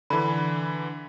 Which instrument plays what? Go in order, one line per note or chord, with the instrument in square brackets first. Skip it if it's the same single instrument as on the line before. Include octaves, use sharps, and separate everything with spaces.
[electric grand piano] D3 E3 [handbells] B5